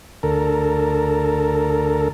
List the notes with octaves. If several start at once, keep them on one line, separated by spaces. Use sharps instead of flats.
D2 A4 A#4